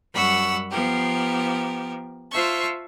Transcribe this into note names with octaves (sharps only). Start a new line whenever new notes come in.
F#2 G3 F#5 B5 C#6 E6
F3 B3 G4 A#4
F4 C5 E5 A5 C#6